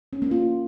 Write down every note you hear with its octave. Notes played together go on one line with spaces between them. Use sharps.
C#4
A#3
F4